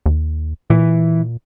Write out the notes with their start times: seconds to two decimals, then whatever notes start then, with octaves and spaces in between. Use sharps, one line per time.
0.06 D#2
0.70 A#2 E3